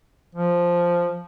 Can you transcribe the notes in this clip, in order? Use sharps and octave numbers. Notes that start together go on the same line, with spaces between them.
F3